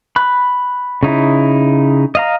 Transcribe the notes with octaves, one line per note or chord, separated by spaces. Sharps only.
B5 F#6
C#3 D#4 E4
D#5 F5 A#5